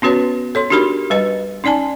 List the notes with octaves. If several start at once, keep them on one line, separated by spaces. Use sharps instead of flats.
B3 C#4 F#4 B4 C#5
A4 C#5 C6
D4 D#4 F#4 G4 A#4 B5
G3 B4 D#5
C#4 D#4 D5 G#5 A5